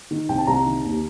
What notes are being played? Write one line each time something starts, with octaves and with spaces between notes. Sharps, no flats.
D#3
C2 G5
A5
C2 A#5
D#3
D#2